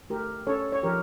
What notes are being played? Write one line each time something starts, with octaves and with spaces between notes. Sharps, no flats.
A3 G4 A#4
C#4 A4 C#5
C#5
F3 G4 A#4